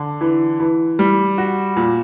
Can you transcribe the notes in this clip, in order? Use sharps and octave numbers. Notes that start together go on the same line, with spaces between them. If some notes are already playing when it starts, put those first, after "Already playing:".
Already playing: D3
E3
E3
G3
F#4
A#2